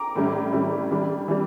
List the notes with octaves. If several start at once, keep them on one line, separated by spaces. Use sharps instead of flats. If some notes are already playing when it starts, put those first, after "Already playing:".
Already playing: A#5 D6
A2 E3 G3 C#4 E4
A2 E3 G3 C#4 E4
E3 G3 D4
E3 G3